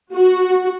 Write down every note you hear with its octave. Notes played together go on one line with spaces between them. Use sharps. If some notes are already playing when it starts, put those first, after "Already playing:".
F#4